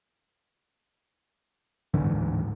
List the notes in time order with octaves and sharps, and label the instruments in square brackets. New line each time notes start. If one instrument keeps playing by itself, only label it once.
[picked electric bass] D1 G#2 D3 E3